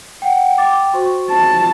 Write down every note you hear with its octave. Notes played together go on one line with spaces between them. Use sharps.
F#5 G5
G5 D6 A6
F#4 C5 C#6
A5